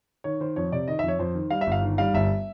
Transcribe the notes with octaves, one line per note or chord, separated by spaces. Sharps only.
D#3 C#5
D#3 C5
F2 C#5
C3 D5
D#3 D#5
F2 E5
C#5
F2 C5
D#3
G3 F5
E5
G1
F5
D#3
G3 F5
G1 E5